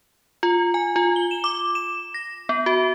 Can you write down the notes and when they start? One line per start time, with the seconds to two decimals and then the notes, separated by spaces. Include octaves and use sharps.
0.43 F4
0.74 G#5
0.96 F4
1.16 G7
1.31 E7
1.44 D6
1.75 E7
2.14 A#6
2.49 B3
2.66 F#4